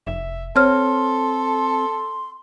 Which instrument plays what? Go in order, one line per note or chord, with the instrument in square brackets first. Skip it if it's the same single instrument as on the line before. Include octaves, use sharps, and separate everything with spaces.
[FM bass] F1 [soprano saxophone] E5
[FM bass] C4 [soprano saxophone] A4 [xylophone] C#5 F6 [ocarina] C6